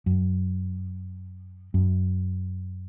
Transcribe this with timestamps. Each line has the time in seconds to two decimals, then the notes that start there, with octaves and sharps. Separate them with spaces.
0.06 F#2
1.74 F#2